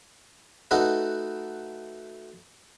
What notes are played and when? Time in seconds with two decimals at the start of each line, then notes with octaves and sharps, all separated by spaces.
0.71 A3 D#4 F#4 B4